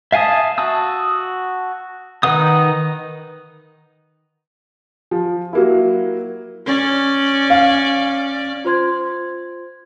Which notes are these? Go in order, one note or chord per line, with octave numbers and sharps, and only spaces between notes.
E5 F5 G#5 A5 D#6
F#4 A5 D#6 E6
D#3 D#4 B4 F#5 D#6
F3
F#3 A#3 E4
C#4 D5
F5
F4 C5 C6 G#6